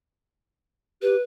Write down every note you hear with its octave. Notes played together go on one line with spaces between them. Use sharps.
G4 B4